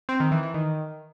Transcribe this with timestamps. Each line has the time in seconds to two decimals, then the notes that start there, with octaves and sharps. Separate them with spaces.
0.09 C4
0.20 D#3
0.32 E3
0.43 E3
0.54 D#3